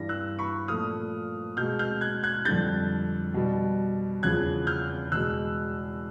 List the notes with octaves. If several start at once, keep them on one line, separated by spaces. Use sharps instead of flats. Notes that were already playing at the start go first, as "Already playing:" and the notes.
Already playing: G2 E3 G3 A#6
E6 F#6
B5 C#6
A#2 F3 A3 D#6 F6
B2 G#3 F6 G6
F6 G6
F#6 G#6
F#6 G#6
F2 D3 G3 G6 A6
B2 G3
E2 C#3 F3 F#6 G#6
F6 G6
E2 B2 G#3 E6 F#6